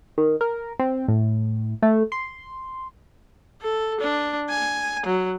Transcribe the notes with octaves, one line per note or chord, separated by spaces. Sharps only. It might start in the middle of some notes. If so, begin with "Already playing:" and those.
D#3
A#4
C4
A2
A3
C6
A4
D4
G#5
F#3